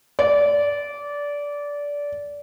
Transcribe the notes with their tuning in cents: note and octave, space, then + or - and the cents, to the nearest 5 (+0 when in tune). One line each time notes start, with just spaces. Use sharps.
D5 -20